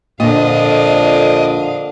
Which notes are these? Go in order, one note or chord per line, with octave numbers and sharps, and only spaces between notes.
F2 A#2 D3 D4 D#5 F5